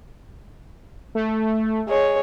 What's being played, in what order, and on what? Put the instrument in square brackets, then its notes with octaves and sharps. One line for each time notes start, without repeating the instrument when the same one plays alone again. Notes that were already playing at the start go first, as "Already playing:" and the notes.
[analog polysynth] A3
[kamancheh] G#3 C#5